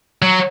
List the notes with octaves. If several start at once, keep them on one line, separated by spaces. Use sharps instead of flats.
F#3